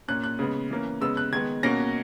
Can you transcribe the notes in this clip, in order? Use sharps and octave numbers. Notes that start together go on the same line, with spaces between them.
A#2 A#3 C#4 F#6
F#6
C#3 G#3 B3
E3 A#3 C#4
C#3 G#3 B3 E6
F#6
D#3 G#3 B3 G#6
B2 A#3 C#4 A#6